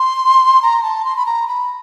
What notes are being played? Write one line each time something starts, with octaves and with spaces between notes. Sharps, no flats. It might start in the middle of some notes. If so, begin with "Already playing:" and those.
Already playing: C6
A#5
A5
C6
B5
A#5
B5